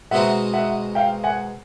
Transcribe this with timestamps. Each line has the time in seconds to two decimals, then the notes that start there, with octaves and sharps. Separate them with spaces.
0.11 B2 G#3 C4 D#4 E5 F#5
0.53 E5 F#5
0.95 F5 G5
1.24 F#5 G#5